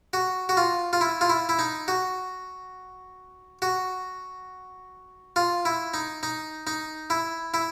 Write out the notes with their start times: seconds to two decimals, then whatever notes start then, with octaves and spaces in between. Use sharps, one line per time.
0.13 F#4
0.49 F#4
0.57 F4
0.93 F4
1.01 E4
1.21 F4
1.29 E4
1.49 E4
1.59 D#4
1.88 F#4
3.62 F#4
5.36 F4
5.65 E4
5.94 D#4
6.23 D#4
6.67 D#4
7.10 E4
7.54 E4